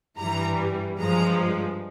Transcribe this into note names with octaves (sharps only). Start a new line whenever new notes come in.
G2 E3 G3 A#5
G2 F3 G#3 A#5